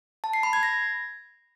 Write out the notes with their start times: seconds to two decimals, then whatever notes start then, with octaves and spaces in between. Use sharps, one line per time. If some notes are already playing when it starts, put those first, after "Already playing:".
0.24 A5
0.34 C7
0.43 B5
0.53 G#6
0.63 A#6